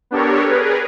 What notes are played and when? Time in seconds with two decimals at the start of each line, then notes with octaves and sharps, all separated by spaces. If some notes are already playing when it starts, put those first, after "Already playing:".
0.11 B3 D4 G4 A4 A#4 C#5
0.49 G#4 A#4 B4